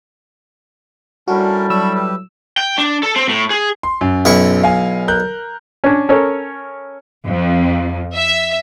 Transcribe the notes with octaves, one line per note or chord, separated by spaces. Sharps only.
A2 G3 C#4 D4 F#4 A#4
F#3 D4 B5 C#6 E6
G4 B4
G5
D4
A4
C4
A2
G#4
C6
F#2
B1 E4 C#6
F5 G#5
A#4 F#6 G6
C#4 D4
C#4 A4 A#4 C#5
F2
E5